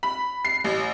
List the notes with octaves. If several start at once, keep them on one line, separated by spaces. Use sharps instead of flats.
B5
C7
A1